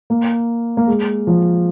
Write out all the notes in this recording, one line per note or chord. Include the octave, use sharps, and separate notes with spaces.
A#3
A#3
G#3
F3